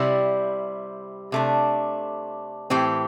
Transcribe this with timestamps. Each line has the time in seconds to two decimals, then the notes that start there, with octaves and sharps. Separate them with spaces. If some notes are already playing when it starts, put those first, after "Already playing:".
Already playing: C3 G3 E4
1.32 C3 A3 D4
2.70 A2 E3 C4 G4